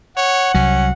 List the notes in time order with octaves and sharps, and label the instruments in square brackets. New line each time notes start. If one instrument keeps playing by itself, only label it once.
[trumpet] C#5 [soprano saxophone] F#5
[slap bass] C2 F#3 [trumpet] C#4